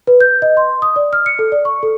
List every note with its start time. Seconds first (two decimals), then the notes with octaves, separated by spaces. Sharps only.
0.07 B4
0.21 G6
0.42 D#5
0.57 C6
0.82 D#6
0.96 D5
1.13 F6
1.26 C#7
1.39 A4
1.52 D5
1.65 C#6
1.83 A4